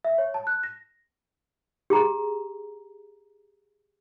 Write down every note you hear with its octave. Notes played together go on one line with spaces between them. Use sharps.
E5
C#5
A5
F#6
A#6
G4 G#4 A#5